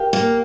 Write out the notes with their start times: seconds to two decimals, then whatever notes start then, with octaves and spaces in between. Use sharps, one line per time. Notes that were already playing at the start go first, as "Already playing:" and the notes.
Already playing: G4 A#4 F5
0.13 A#3